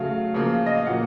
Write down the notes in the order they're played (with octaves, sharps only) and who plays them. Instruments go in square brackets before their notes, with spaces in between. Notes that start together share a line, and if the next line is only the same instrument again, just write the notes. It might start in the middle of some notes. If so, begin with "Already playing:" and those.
Already playing: [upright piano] C#3 F#3 A3 F5
C#3 F3 A#3
D#5
F5
A#2 F#3 A#3 F#5